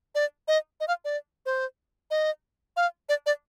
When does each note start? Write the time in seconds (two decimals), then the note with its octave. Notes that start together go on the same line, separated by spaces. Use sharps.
0.15 D5
0.48 D#5
0.80 D#5
0.88 F5
1.05 D5
1.46 C5
2.11 D#5
2.77 F5
3.09 D5
3.26 D5